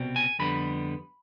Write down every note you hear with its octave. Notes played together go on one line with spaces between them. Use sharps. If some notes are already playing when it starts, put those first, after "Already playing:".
Already playing: C2 B2 G3 C4
G#5
F2 D3 G3 B3 B5